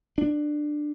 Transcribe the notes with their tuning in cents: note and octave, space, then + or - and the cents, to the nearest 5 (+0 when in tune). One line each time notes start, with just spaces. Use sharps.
D4 +15